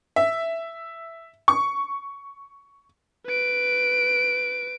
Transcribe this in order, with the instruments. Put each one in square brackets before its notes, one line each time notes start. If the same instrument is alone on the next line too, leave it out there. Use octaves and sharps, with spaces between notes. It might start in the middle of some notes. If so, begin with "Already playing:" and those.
[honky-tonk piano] E5
C#6
[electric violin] B4 D7